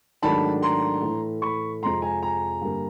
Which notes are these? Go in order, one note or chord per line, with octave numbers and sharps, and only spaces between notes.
G#2 D#3 F#3 A3 D4 A5 B5
A#5 C6
A2 E3 A3
B5 C#6
F2 C3 F3 G#3 A#5 C6
G#5 A#5
G#5 A#5
G2 D3 G3 A#3